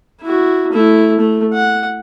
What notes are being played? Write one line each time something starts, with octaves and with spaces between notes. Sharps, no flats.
E4 F#4
A3 E4
A3
F#5